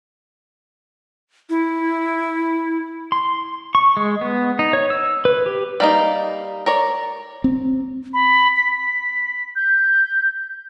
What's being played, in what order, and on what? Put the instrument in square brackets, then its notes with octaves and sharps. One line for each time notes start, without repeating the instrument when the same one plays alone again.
[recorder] E4
[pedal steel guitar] C6
C#6
G#3
B3
D#4
C#5
E6
B4
G4
[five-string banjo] G3 A#3 D#4
A#4 C#5 D5
[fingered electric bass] C4
[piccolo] B5
B6
G6